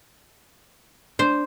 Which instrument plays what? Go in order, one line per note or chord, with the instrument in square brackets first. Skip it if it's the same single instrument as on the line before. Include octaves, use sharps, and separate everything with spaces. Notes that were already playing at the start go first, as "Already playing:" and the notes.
[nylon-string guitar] D4 [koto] C5